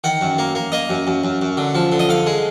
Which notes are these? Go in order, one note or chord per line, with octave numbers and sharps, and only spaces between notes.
D#3 F#5
F#2
A#3
A#3
A#3 D#5
F#2
F#2
F#2
F#2
D3
F3
D3
D#5
D3 F5
G#3